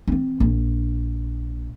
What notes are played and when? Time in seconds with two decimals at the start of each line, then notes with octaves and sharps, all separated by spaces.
0.08 E3 C4
0.40 A#1